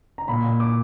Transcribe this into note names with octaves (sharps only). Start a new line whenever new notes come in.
A#5
A#2 B5
A#2
D6